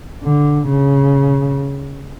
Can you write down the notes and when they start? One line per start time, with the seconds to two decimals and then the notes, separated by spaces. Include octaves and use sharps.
0.23 D3
0.68 C#3